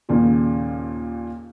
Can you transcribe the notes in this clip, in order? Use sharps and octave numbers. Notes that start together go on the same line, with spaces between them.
D#2 A#2 C#3